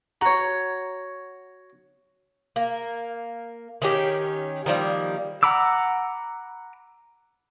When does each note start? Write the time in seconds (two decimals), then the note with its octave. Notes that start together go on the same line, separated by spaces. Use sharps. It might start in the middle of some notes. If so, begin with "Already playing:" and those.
0.21 F#4 C#5 A#5
2.56 A#3
3.82 D#3 C#4 G4
4.66 D#3 F3 G3 A#3
5.43 F#5 A#5 B5 D6 E6